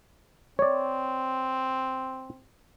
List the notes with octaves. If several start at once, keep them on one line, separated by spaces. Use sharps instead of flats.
C4 C#5 D5